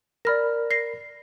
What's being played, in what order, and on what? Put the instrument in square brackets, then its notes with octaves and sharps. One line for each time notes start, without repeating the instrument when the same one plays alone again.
[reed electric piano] A#4 B5 [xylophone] D5 F6 A#6
[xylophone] A#6 C7